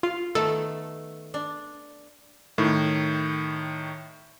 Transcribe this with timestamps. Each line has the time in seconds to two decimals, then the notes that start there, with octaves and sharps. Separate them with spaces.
0.03 F4 F5
0.35 D#3 A3 B3 A4
1.34 D4
2.58 A2 D#3